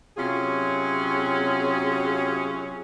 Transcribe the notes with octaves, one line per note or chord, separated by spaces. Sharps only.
C3 F#3 C#4 F4 G#4